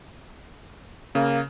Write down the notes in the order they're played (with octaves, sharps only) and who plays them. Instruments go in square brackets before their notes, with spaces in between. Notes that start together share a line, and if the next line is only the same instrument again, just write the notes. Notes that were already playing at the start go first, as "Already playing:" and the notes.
[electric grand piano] C#3 [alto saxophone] A#3